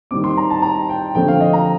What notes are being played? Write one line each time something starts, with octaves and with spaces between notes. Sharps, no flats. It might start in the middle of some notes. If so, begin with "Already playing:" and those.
D#3 G3 C4 D6
C6
A#5
A5
A#5
G5
D3 F3 A3 C4 G5
F5
D#5
A#5